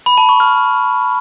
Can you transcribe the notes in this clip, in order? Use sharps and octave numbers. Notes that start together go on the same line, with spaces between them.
B5
A5
C#6
F6